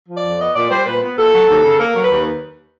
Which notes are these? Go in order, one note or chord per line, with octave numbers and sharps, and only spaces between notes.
F3
D5
F2
B3 D#5
A#2 D5
G3 C5
A#2 B4
B3
A#2 A4
F#3
D#2
C#3
A#3 A#4
F#3
B4
D#2